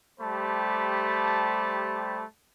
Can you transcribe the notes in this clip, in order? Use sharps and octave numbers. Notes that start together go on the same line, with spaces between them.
G3 A3 G4 C5 A5 B5